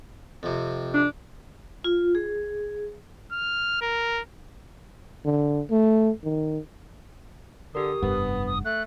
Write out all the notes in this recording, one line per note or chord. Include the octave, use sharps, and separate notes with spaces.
F2 C3
D4
F4
G#4
F6
A#4
D3
A3
D#3
D3 G4 A#4 D#6
F1 G2 B3 F#5
D#6
A3 F#6